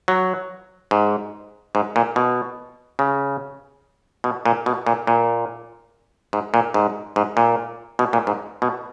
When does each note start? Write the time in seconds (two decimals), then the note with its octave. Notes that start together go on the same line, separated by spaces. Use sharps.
0.08 F#3
0.91 G#2
1.75 G#2
1.96 A#2
2.16 B2
2.99 C#3
4.24 B2
4.46 A#2
4.66 B2
4.87 A#2
5.07 A#2
6.33 G#2
6.54 A#2
6.74 G#2
7.16 G#2
7.37 A#2
7.99 B2
8.13 A#2
8.27 G#2
8.62 B2